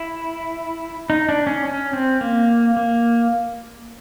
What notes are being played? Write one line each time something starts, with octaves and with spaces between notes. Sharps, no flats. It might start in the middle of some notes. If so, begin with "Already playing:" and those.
Already playing: E4
D#4
D4
C#4
C#4
C4
A#3
A#3